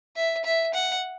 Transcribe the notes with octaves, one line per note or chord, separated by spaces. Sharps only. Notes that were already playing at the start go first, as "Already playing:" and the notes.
E5
E5
F#5